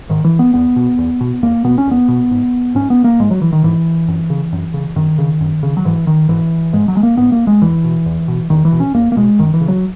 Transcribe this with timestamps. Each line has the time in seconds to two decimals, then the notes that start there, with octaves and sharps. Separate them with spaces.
0.09 G#2 D#3
0.24 E3
0.39 B3
0.54 E2 B3
0.76 B2
0.98 E2
1.21 B2
1.43 E2 A#3
1.64 B2 B3
1.78 C#4
1.87 E2 B3
2.08 B2
2.31 G#2
2.75 G#2 C#4
2.90 B3
3.04 A#3
3.19 G#2 G#3
3.31 F#3
3.42 E3
3.52 D#3
3.64 G#2 E3
4.08 F#2
4.30 C#3
4.53 F#2
4.74 C#3
4.96 F#2 D#3
5.18 C#3
5.41 F#2
5.63 C#3
5.77 F#3
5.85 G#2 E3
6.07 D#3
6.29 G#2 E3
6.73 G#2 G#3
6.88 F#3
6.97 G#3
7.03 A#3
7.17 G#2 B3
7.32 A#3
7.47 G#3
7.62 E2 E3
7.84 B2
8.06 E2
8.28 B2
8.50 E2 D#3
8.65 E3
8.72 B2
8.80 C#4
8.94 E2 A#3
9.12 A#3
9.16 B2 G#3
9.39 F#2 D#3
9.54 E3
9.61 C#3
9.68 F#3